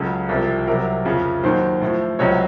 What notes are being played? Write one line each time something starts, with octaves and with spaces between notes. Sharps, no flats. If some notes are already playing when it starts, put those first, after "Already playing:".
Already playing: C#2 C#3 F#3 A4
C2 C3 F3
C2 C3 F#3 A#4
F2 C#3 F3
D#2 D#3 F#3 C5
A2 F3
C#2 C3 F#3 C#5